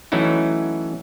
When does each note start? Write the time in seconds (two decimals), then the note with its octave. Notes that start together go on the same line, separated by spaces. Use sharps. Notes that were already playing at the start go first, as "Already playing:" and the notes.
0.12 E3 F#3 A3 C#4 D#4 E4